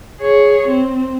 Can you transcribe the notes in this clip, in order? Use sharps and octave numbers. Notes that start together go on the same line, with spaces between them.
G#4 C#5
C4